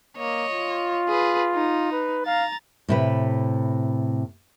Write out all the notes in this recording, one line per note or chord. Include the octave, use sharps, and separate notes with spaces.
A#3 C#5 D#5
F4
G#4 B4
D#4
B4
F5 A#5 A6
A2 C3 B4